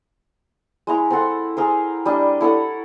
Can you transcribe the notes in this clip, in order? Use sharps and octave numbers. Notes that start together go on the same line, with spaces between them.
G#3 E4 A#5
C4 A4 F#5 C6
G#4 A#4 C5
G3 D4 D#5
E4 A4 C#5 F#5